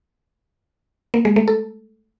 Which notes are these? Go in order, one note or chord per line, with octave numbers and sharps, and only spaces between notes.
A#3
G#3
A3
A4